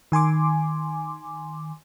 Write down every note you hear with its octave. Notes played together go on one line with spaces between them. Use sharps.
D#3 G#5 C6 D6